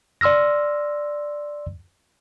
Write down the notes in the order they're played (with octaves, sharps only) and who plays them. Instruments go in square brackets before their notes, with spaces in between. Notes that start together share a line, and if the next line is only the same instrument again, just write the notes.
[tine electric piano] D5 C6 E6 F6 A#6